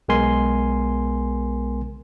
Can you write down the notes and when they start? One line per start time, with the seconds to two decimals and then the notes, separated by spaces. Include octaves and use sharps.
0.08 B1 G#3 B3 A#4 G#5 C6